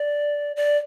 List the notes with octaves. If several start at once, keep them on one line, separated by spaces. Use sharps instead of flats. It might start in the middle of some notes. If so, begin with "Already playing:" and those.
Already playing: D5
D5